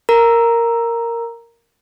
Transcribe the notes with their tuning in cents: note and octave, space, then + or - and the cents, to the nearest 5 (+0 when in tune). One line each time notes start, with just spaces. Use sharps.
A#4 -5 A#5 +0